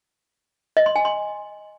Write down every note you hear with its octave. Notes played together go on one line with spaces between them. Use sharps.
D#5
C6
G#5
C6